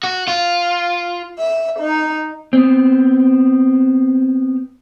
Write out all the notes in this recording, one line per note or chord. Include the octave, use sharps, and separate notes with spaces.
F#4
F4
E5
D#4
B3 C4